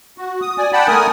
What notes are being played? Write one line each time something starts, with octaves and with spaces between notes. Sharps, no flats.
F#4
D#6
D5 G#5
D5 F#5 G5 A5 B5
A3 A#4 G#5 D#6